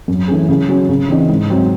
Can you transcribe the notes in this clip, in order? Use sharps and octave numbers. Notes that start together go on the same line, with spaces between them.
F#2
E3 A3 C#4 G#4
C#3
F#3 C#4 F#4
C#3
E3 C4 D#4
G#2
F#3 C4